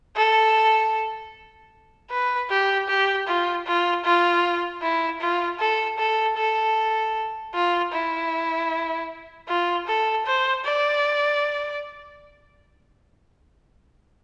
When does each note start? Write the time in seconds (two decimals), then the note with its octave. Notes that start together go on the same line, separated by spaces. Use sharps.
0.17 A4
2.11 B4
2.50 G4
2.88 G4
3.27 F4
3.66 F4
4.05 F4
4.82 E4
5.21 F4
5.59 A4
5.99 A4
6.37 A4
7.54 F4
7.93 E4
9.48 F4
9.87 A4
10.26 C5
10.65 D5